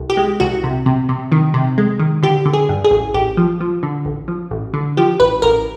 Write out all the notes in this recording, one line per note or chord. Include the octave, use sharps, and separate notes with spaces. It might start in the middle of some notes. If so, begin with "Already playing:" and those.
Already playing: C2
G4
G#3
C2 F#4
C3
C3
C3
D#3
C3
G#3
D#3
D3 G4
D3
G#4
G2
G#4
A1
A1 G4
F3
F3
D3
A1
F3
A1
D3
F3 G4
A1 B4
A1 A#4